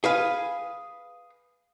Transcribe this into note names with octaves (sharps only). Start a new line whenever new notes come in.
G#4 B4 F5